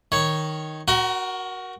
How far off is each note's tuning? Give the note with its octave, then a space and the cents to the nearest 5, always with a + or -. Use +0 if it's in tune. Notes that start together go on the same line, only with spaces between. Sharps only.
D#3 +0 C#5 +0
F#4 +0 A#4 +20 F#5 +40